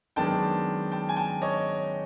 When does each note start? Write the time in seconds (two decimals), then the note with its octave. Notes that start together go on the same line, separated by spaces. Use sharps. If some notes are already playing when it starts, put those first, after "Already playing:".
0.16 F#2 D#3 G#3 B3 D4 G5 A5
0.92 G5 A5
1.09 G#5
1.16 G5 A5
1.42 C#5 D#5